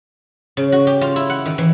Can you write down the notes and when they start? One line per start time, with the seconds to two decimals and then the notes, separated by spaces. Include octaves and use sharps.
0.57 C#3
0.72 F#4
0.87 G4
1.01 F4
1.16 E4
1.30 F#5
1.46 D#3
1.58 E3